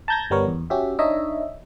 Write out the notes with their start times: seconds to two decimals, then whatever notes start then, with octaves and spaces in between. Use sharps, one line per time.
0.08 A5 A#5 G6 G#6 A#6
0.30 G1 G3 B3 A#4 C#5
0.48 E2
0.70 C#4 F#4 G4 E5
0.99 D4 D#4 C#5 D#5 E5